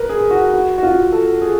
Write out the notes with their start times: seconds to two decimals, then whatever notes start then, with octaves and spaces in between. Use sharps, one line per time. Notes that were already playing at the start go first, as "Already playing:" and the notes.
Already playing: A#4 B4
0.09 G#4
0.31 F#4
0.54 F#4
0.78 F#4
0.83 F4
1.12 A4
1.42 G#4